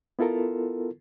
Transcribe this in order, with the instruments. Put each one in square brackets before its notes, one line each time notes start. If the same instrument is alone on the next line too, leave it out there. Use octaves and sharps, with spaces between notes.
[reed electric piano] B3 E4 F4 A4 A#4